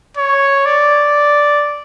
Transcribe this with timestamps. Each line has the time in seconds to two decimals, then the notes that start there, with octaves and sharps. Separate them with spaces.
0.17 C#5
0.66 D5